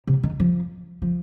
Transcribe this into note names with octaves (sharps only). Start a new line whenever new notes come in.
C3
D#3
F3
F3